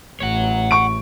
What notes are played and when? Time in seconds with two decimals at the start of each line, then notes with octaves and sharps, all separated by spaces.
0.20 A1 C#5 F#5
0.71 C#6 D7